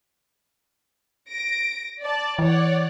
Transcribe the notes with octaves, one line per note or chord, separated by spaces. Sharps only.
A#6 D7
D5 A5
E3 C#5 D5 F#5